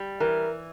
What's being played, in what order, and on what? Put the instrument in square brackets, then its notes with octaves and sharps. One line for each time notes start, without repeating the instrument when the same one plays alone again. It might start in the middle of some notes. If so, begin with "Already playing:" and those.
Already playing: [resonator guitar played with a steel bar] G3
[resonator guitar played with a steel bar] E3 [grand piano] A#4